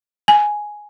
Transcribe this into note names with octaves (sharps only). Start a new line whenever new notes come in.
G#5